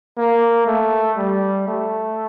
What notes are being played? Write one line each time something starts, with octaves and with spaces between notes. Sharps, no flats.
A#3
A3
G3
A3